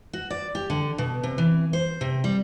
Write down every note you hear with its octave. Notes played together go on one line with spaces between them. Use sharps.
F#4
D5
G4
D3
B2
C3
E3
C5
C3
G3